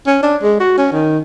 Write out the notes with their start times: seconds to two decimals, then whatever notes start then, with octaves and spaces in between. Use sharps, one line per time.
0.06 C#4
0.23 D4
0.42 G#3
0.60 F#4
0.78 C#4
0.92 D#3